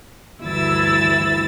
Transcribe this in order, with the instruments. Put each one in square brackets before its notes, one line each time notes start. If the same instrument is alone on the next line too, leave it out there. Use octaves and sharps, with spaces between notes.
[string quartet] D2 G2 E3 E4 E6 A6